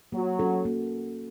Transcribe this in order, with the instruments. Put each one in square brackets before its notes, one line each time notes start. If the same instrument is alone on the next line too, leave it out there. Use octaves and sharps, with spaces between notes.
[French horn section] F#3 [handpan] A#3
[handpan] C#4 F#4 A4
A#3